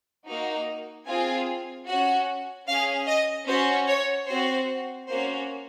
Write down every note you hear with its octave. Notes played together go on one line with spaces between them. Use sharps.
A#3 D#4 F#4
C4 F4 G#4 G#5
C#4 F#4 F#5
C#4 F5
G#4
D#5
C#4 F#4 C5
C#5
C4 F#4 C5
A#3 C#4 F#4 C5